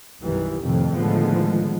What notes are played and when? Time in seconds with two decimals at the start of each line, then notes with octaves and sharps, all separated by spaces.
0.22 B1 F#2 D#3 E3 G3
0.61 F2 A2 C3 D#3 F3
0.93 A2 D3 D#3 F3 G#3 B3